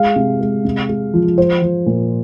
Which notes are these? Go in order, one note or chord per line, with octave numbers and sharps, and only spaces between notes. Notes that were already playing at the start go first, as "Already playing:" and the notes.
Already playing: G#3 F5
C3
G#3
C3
G#3
F3
F3 C5
F3
A#2